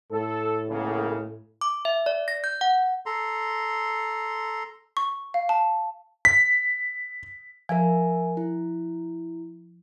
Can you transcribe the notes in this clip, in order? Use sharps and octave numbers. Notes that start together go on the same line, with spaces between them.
A2 A4
B1 C#3 A#3
D6
E5
D5
A#6
G6
F#5
A4 A#5 C6
C#6
F5
A5
B6
F3 A#4 E5 G#5
E4